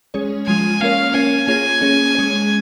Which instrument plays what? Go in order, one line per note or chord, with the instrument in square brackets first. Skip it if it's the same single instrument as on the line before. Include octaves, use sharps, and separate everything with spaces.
[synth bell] G#3 C#4 G#4 C#5
[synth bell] F3 G#3 F4 [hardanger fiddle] G#5
[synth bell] A#3 C#4 A#4 C#5 [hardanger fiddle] F5
[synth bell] C#4 A#4 C#5 [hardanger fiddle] G#5
[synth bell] A#3 F4 G#4 C#5 [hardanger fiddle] G#5
[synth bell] A#3 C#4 G#4 C#5
G#3 C#4 G#4 C#5